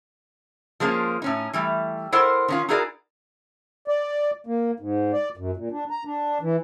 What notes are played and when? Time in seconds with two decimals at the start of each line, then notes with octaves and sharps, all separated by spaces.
0.80 F3 G#3 A#3 C#4 F4
1.22 A2 C#4 D#4
1.53 E3 G3 A3
2.12 E4 A4 A#4 C5 D#5 F#5
2.48 D#3 C#4 F4
2.69 D#4 E4 F#4 G#4 A#4 D5
3.88 D5
4.47 A#3
4.80 G#2
5.13 D5
5.37 F#2
5.57 A#2
5.72 D4
5.90 A#5
6.05 D4
6.42 E3